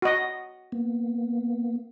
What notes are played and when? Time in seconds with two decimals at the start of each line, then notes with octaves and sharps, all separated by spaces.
0.02 F#4 D#5
0.72 A#3 B3